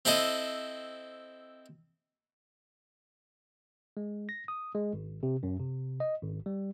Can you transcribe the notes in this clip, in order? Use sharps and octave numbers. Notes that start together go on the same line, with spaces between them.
C4 E4 A4 D#5
G#3
A#6
D#6
G#3
G#1
C3
F#2
C3
D#5
G#1
G3